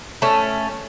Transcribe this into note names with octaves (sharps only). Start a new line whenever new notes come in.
A3 C#4